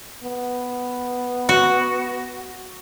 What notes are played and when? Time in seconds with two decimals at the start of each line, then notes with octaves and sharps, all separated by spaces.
0.23 B3
1.49 F#4